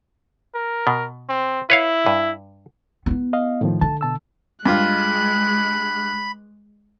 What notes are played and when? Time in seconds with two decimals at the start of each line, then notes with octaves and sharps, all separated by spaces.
0.55 A#4
0.87 B2
1.29 C4
1.70 E4 B4 C#5 F5
2.06 G2
3.06 B3 E4
3.33 D#5 F5
3.61 A2 D#3 F3
3.81 D3 A5
4.01 B2 A5 E6
4.66 G2 G#3 F4 B5 F#6